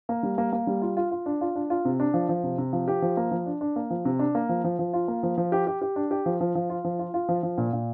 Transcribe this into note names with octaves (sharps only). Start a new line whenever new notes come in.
A#3
G3
A#3
A#3
G3
F4
F4
F4
D4
F4
D4
F4
C3
D4
F3
F3
C3
C3
F3
G4
F3
A#3
F3
D4
D4
A#3
F3
C3
D4
A#3
F3
F3
F3
F4
A#3
F3
F3
G4
G4
G4
D4
G4
F3
F3
F3
F4
F3
F4
F4
F3
F3
A#2
A#2